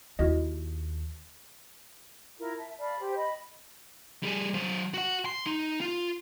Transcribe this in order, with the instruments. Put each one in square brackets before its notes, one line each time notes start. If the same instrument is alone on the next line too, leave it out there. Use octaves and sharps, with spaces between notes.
[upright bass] D#2 [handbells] E4 F#4 D#5
[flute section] E4 F4 A#4
E5 A5
D5 F5 A5 B5
G4 C5
D#5 B5
[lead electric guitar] G3 G#4
F#3 C5
F#4 F#5
C6
D#4
F4